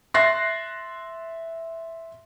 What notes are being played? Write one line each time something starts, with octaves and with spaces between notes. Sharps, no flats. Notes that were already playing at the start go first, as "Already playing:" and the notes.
E5 C6 F#6 A6 A#6 C7